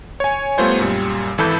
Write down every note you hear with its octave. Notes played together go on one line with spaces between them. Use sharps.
C#5 G#5
G3 A3 B3 F4 C5 C#5
F#2 A#2 G3
G#1 E3 A4 B5 G6